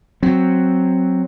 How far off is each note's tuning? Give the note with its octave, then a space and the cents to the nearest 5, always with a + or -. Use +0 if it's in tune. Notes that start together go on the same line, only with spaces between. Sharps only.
F#3 +0 C4 +0